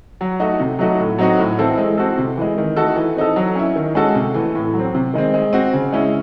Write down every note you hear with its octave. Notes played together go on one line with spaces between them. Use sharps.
F#3
A3 D#4 F#4
C3
F#3 A3 D#4 F#4
A2
F#3 C4 D#4 F#4
A2
E3 C4 E4 A4
G#3
C4 F#4 A4
C3
E3 G#3
D#3
A3 D#4 F#4 A4
E3
C4 D#4 A4
F#3
C#4 E4
D#3
G#3 C#4 F#4 A4
C3
E3 A3
A2
F#3
C4
C3
D#3 G#3 C4
G#3
C4 F#4
C#3
G#3 C#4 E4